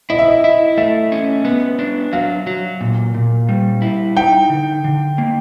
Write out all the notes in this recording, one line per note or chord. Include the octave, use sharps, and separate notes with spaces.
E4 D#5
E5
D#5
E4
A3 E5
C#4
B3
D4
F#3 F5
F#3
A#2
A#2
G3
E4
D#4 G5
D3
D3
A#3